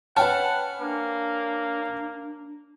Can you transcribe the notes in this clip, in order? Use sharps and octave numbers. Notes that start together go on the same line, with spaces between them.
C#4 B4 F#5 G5 A5
A#3 D4